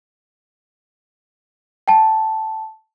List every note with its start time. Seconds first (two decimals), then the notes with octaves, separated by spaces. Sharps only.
1.88 G5 A5